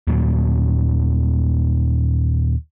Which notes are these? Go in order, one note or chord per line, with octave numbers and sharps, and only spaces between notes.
D#2 A#2 F#3